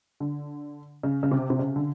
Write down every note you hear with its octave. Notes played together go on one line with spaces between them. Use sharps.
D3
C#3
C#3
C3
C3
C#3
D3